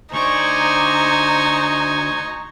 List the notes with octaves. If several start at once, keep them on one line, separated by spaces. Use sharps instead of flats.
D2 D#4 C5 D5 G#5 C#6